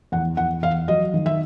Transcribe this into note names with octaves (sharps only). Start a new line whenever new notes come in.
E2 F#5
E2 F#5
E2 F5
F#3 D#5
D#3
E5